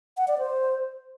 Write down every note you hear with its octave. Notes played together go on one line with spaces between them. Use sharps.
F#5
D5
C5